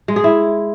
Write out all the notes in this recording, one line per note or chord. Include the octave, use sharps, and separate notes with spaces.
G#3
G#4
E4